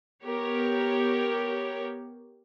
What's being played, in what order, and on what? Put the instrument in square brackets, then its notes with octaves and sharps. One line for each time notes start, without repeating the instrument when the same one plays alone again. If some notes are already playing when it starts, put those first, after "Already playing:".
[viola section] B3 G4 A#4 C#5